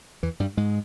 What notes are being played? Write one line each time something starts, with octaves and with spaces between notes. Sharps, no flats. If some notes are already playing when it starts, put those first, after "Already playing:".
E2 E3
G2 G3
G#2 G#3